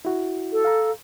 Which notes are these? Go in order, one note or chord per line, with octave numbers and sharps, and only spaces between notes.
E4 F#4
A4
F5 A#5